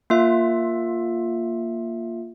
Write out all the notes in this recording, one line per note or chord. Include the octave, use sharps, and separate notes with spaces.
A#3 F4 E5